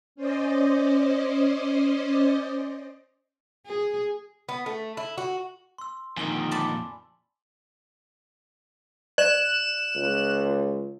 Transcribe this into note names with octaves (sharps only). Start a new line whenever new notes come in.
C#4 C5 D5 D#5
G#4
B3
A3
E4
F#4
C6 E6
F2 A#2 D#3 G#5 F#7
D5 A5 B5
D5 F#6 E7
C#2